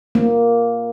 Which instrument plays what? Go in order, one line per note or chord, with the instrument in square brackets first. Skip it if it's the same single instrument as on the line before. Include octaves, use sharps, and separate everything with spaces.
[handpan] A#3